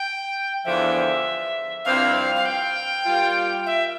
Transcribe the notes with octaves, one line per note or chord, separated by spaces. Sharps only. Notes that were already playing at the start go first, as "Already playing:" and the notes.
Already playing: G5
E2 D3 F3 E5
G2 F3 C4 E4 F5
F5
G5
G3 A#3 F4
E5